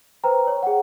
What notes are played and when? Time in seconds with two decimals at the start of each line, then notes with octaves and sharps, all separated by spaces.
0.24 B4 C5 G5 A#5
0.47 C#5
0.63 G#4 F#5